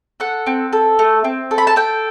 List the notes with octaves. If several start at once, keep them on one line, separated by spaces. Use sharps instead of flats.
A4 F#5
C4
A4
A3
C4
A4
B5
A5
A4 G5